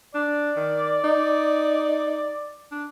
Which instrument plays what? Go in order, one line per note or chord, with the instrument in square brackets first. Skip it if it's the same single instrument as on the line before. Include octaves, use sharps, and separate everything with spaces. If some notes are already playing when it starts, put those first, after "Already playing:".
[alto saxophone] D4 [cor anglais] D5
[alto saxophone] D#3
D#4
D4